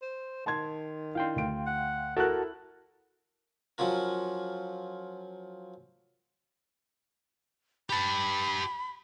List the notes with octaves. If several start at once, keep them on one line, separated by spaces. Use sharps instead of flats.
C5
D#3 A5 C6 G#6
D4 E4 F5 G5 C6
D2 D7
F#5
E4 F#4 A4 A#4 A5 F#6
F3 F#3 C#4 F4 A#4
G4 A5 B5